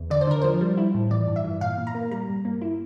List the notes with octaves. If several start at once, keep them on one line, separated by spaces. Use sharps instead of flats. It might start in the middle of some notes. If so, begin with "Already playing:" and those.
Already playing: E2
D3 D5
C5
D3 A#4
F3 C5
G3
E4
A2
E3 D5
G2
E5
E3
A#2 F5
A#2
A#5
A#3
G3 A#5
G2
A#3
E4